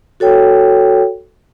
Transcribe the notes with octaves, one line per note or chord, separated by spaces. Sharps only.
F#4 A4 C#5 G5